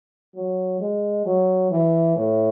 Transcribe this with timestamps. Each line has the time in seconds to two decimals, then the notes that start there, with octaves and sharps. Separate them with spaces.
0.35 F#3
0.80 G#3
1.26 F#3
1.71 E3
2.16 A2